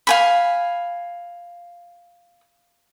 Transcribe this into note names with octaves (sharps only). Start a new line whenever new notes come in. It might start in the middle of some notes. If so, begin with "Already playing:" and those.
F5 G#5 B5